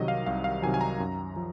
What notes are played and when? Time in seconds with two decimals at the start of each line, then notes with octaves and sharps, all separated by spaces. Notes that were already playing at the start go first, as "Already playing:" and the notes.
Already playing: C2 C3 D#3 F#3 D#5
0.08 F5
0.26 C2 F5
0.44 F5
0.62 C3 D#3 F#3 G#5
0.74 G#5
0.81 A#5
1.00 F#2
1.36 F3